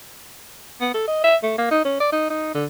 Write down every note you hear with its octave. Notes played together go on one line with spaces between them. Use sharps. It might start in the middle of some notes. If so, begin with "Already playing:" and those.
B3
A4
D#5
E5
A3
A#3
D#4
C#4
D5
D#4
D#4
D3